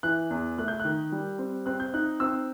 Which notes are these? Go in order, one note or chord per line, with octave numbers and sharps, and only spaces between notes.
E3 F#6
E2
A3 F#6
G6
F#6
D#3
G3
C4
C4 F#6
G6
D#4 F#6
C4 E6